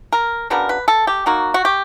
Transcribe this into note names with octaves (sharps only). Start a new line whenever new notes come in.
A#4
C#3 F#3 B3 D4 A#4
B4
A4
G4
F#3 A#3 D#4 F#4
F#4
G4